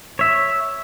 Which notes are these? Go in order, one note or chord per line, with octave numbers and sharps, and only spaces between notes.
C#5 E5